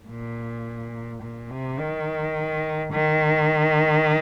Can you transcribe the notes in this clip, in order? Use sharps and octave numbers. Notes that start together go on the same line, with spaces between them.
A#2
A#2
C3
D#3
D#3